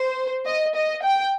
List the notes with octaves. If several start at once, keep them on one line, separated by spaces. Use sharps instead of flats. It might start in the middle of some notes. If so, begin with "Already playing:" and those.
Already playing: C5
D#5
D#5
G5